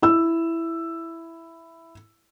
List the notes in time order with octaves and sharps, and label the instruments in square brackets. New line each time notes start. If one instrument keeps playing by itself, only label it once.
[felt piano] E4 E6